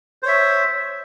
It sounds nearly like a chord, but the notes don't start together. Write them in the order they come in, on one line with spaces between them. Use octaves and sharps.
C5 C#5 E5